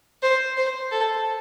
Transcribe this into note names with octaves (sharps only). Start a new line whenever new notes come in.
C5
C5
A4